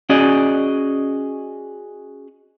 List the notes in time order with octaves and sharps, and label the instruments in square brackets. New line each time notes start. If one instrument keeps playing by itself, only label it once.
[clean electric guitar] C#4 F#4 G#4 D5 D#5